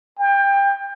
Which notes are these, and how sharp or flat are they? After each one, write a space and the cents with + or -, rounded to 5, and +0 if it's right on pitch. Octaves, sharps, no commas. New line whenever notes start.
G5 +25